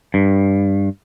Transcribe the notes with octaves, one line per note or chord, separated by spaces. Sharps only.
G2